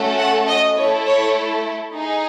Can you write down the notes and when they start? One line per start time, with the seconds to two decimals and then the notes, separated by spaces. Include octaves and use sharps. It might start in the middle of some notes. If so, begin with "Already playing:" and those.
Already playing: A3 C#4 F#4 A4
0.18 F#5
0.47 D#5
0.77 A3 E4 A4 C#5
1.06 C#5
1.94 D#4 G#4